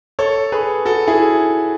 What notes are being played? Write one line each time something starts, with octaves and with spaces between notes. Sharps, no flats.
A4 C#5
G#4 B4
F#4 A4
E4 G#4